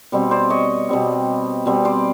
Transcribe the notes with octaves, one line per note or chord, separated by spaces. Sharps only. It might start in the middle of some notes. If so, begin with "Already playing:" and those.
B2 G3 C4
C5 D5
C#5 D#5
B2 G3 C4
B2 G3 C4
C5 D5